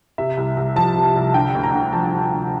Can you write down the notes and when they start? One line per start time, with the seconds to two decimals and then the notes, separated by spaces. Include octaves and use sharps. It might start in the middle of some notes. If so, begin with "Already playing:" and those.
0.18 C3 E5
0.37 C2
0.57 C2
0.76 F3 A5
0.96 C3
1.16 C2
1.34 D3 G5
1.55 D2
1.63 A#5
1.73 D2
1.93 F3 A5
2.13 D3
2.32 D2